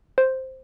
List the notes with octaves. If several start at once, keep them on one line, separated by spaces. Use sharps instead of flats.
C5